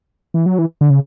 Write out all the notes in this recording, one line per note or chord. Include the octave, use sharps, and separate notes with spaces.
E3
F#3
E3
D3
C#3